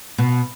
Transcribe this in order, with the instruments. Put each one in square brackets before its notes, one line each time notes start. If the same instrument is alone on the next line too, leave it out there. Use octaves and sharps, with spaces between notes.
[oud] B2